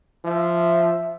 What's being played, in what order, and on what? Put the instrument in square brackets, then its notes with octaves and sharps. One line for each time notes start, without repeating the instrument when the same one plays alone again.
[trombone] F3 [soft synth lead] E5